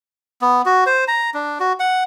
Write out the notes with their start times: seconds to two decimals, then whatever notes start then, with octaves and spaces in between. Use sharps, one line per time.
0.42 B3
0.66 F#4
0.86 C5
1.08 A#5
1.34 D4
1.60 F#4
1.80 F#5